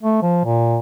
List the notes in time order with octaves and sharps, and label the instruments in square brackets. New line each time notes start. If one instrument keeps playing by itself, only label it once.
[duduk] A3
F3
A#2